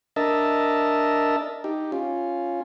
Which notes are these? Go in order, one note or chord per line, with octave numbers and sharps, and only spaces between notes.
D4 A#4 D#5 E5 A5
D#4 G4
C#4 F4